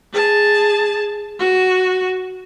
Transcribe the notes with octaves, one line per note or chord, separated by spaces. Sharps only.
G#4 A5
F#4